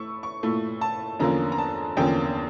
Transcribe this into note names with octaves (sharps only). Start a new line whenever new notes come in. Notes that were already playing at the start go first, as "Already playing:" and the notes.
Already playing: A3 E4 C#6 E6
C#6
A#2 A3 E4
A5
E2 D3 F3 A#3 C#4 A#5
A#5
A5
E2 D3 F3 A#3 C#4 G5